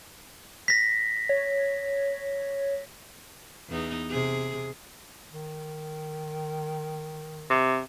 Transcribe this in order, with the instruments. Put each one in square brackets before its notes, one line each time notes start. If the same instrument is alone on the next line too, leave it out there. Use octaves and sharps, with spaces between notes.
[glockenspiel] A#6 B6
[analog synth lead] C#5
[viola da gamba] E2 B3 D#4
C3 G#4
[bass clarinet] D#3
[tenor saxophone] C3